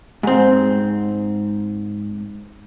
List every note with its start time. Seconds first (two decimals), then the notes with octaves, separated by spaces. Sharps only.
0.23 G#2 C4